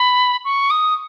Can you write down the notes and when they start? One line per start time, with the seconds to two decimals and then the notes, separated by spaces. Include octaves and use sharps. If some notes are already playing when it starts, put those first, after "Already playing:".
Already playing: B5
0.45 C#6
0.70 D#6